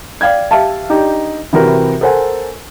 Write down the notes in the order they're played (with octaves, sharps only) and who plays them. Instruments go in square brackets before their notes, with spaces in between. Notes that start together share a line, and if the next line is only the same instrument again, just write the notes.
[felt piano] D5 F5 G5 G#6
G4 E5 F5 A5
D4 D#4 G4
C3 E3 C4 F#4 A#4 B4
A4 A#4 C5 F#5 G#5